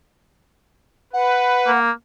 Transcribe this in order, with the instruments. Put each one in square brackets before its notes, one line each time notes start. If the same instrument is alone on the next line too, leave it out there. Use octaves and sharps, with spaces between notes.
[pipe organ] B4 [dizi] F#5
[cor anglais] A#3